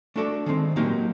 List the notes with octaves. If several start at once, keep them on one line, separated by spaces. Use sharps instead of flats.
A3 D4 F#4 A4 D5
D#3 G#3 C4 D#4
A#2 F#3 A#3 D#4 G4